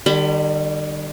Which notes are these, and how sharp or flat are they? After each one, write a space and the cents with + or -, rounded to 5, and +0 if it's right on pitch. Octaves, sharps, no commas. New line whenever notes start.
D#3 -45 G3 +0 B5 +30